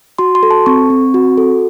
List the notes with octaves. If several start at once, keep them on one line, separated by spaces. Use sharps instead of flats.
F#4 C6
C6
A4
A5
C4 C#6
C4
F#4
A4